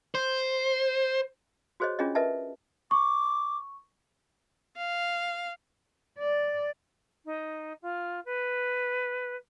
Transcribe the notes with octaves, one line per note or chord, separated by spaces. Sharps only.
C5
F#4 G#4 C5 C#5 D#5
C#4 D4 F4 G#4 C#5 D#5
A#4 B4 D#5 E5 A5
C#6 D6
F5
D5
D#4
F4
B4